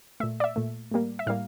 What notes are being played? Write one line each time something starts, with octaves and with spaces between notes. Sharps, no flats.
A#2 A3 E5
D5
E5
A#2 A3
A2 G3 A#3
E5
A2 G3 A#3 F5